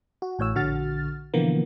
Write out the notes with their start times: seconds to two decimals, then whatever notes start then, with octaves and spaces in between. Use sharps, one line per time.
0.22 F#4
0.39 A1 A2 C#5 E6
0.55 A#1 D3 F#4 F6 A6
1.34 B2 D3 E3 F3 A#3 B3